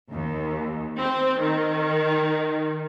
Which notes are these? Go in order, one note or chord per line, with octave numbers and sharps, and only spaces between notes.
D#2
C4
D#3